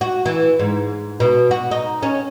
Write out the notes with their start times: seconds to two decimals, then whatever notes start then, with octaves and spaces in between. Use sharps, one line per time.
0.01 F#4
0.26 E3
0.59 G#2
1.20 B2
1.51 F#4
1.71 D#4
2.03 C#4